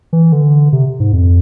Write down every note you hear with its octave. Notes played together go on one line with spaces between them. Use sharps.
E3
D3
C3
G#2
F2